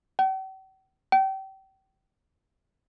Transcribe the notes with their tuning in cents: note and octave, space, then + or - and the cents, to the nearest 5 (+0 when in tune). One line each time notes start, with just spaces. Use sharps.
G5 -45
G5 -30